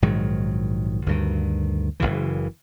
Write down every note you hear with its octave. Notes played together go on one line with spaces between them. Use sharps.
A#1 G#2 D#3 F#3
D2 G2 D#3
F#1 D2 C#3 E3